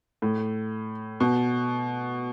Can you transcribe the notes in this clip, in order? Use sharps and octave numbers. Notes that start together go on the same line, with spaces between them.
A2
B2